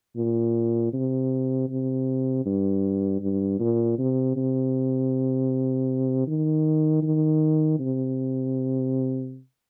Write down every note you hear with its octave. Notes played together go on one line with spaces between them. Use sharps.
A#2
C3
C3
G2
G2
A#2
C3
C3
D#3
D#3
C3